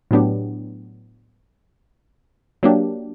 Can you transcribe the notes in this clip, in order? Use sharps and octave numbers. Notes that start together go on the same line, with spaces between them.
A2 F#3 B3 D4 G4
F#3 A#3 D4 G4